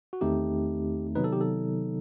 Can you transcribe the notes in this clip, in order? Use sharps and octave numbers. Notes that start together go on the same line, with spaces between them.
F#4
E2 D#3 A3 C4 D#4 G4
C3 D#3 F#3 B3 D#4 B4
A4
G4
A4